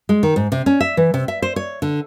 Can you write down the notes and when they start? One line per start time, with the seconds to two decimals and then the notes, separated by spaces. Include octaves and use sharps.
0.09 G#3
0.23 D#3
0.36 G#2
0.52 C3
0.66 C#4
0.81 E5
0.97 E3
1.14 C3
1.28 E5
1.42 C5
1.56 C#5
1.82 D3